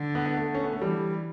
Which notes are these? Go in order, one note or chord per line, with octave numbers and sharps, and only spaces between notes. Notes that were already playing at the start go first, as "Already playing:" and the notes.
Already playing: D3
B3
B3
A3
C#4
B3
A3
E3 G3